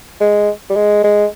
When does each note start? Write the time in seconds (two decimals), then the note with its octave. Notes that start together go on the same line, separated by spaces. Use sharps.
0.21 G#3
0.70 G3
0.76 G#3
1.04 G#3